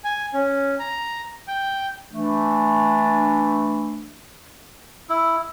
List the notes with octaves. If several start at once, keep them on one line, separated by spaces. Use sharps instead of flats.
G#5
C#4
A#5
G5
E3 A3 D4
E4